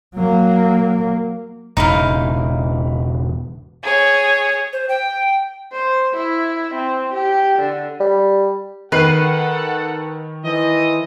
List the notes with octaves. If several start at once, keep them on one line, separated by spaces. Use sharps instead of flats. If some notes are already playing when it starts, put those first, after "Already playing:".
F#3 A#3
E1 G#2 C#3 D#4 E4 F5
G#4 C#5
C5
G5
C5
E4
C4
G4
D3
G3
D#3 A4 B4 F#5 C7
E3 A4 C5 D#5